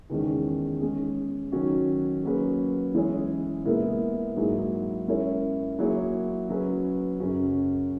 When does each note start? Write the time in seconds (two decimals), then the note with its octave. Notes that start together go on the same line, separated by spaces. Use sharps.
0.10 E2 D#3 G#3 C#4
0.81 G#3 C#4 G#4
1.52 D#3 F#3 C#4 F#4
2.24 F#3 A#3 C#4 G#4 B4
2.94 E3 G#3 C#4 G#4 C#5
3.65 A#2 G#3 B3 E4 A#4
4.36 G#2 F#3 A#3 E4 G#4
5.07 G#3 C#4 E4 A#4 C#5
5.79 F#3 A#3 E4 G#4 C#5
6.49 F#3 C#4 G#4 B4
7.20 F#2 C#3 F#3 C#4 F#4